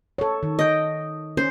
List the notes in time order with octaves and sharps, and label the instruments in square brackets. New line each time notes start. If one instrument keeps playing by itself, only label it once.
[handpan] A4 C#5
D#3
[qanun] D#5 G5
[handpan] C#4 [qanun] C5